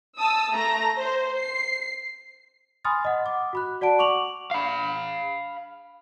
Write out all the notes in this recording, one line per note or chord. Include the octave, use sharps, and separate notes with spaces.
A5 D#6 E6
A3 A#5 A#6
C5
C7
G#5 B5 C6 D#6 F6 A6
D#5 F#5
D6
F#4 B5 F#6
F#4 D5 F#5 A5 D7
C#6 D6 F7 F#7
F5 B5